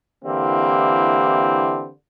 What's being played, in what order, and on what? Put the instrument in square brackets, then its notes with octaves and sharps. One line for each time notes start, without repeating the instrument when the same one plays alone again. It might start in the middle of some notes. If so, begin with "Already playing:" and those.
[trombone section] D3 E3 A#3 C4 E4 G4